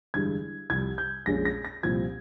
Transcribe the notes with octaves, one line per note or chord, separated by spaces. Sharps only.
G1 G2 E3 G#3 G#6
C2 C3 F3 G#6
G6
A#1 A#2 G#3 C#4 A#6
A#6
A#6
C2 A#2 F3 C4 G#6